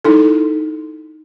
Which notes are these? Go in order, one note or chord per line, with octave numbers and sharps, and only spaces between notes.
D#4 E4 A4